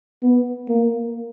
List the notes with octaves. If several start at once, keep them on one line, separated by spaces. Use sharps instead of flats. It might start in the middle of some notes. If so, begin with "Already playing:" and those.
B3
A#3